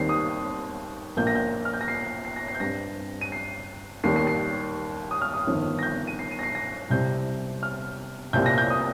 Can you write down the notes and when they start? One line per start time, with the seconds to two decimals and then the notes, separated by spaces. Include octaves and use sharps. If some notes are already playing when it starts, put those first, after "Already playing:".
Already playing: D#2 D#3 G3 C4 C7
0.09 D#6
1.17 A#1 A#2 A#3 G6
1.27 A#6
1.36 G6
1.65 F6
1.73 G6
1.81 A#6
1.88 C7
2.25 C7
2.36 A#6
2.48 C7
2.55 G6
2.60 G2 G3 C4 A#6
3.21 D#7
3.32 C7
4.04 D#2 D#3 G3 A#3 C7
4.16 C7
4.27 C7
5.11 D#6
5.22 F6
5.34 D#6
5.47 G1 F2 D#3
5.79 A#6
5.83 G6
6.07 D#7
6.19 C7
6.31 D#7
6.39 A#6
6.43 C7
6.55 A#6
6.90 C2 C3 G3 C4 G6
7.63 F6
8.33 C2 A#2 G3 C4 G6
8.46 A#6
8.58 G6
8.70 D#6